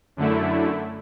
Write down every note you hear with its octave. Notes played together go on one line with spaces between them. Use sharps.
F#2 D3 A3 E4